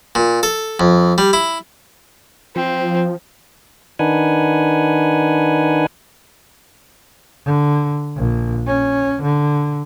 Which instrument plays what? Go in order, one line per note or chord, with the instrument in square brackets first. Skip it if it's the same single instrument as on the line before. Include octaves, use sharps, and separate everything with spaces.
[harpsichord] A#2
A4
F2
G3
E4
[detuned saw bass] F3 [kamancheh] C4
[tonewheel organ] D#3 D4 D#4 B4 F#5 G#5
[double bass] D3
A#1
C#4
D3